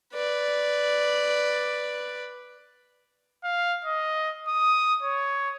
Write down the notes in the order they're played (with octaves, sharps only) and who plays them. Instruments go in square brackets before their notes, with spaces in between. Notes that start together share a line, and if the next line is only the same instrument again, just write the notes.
[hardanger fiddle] B4 D5
[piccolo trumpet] F5
D#5
D#6
C#5